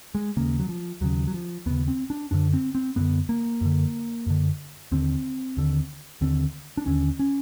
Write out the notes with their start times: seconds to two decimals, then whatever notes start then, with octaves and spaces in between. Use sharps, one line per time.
0.15 G#3
0.37 D#2 C#3 A#3
0.59 F#3
0.69 F3
1.01 D#2 C#3 F#3
1.27 F#3
1.34 F3
1.66 D#2 C#3 B3
1.88 C4
2.10 D4
2.31 F#2 D3 D4
2.53 C4
2.75 C4
2.96 F#2 D3 B3
3.29 A#3
3.61 F#2 D3
4.26 F#2 D3
4.92 D#2 D3 C4
5.57 D#2 D3
6.21 D#2 D3 C4
6.77 D4
6.86 D#2 D3 C#4
7.19 C#4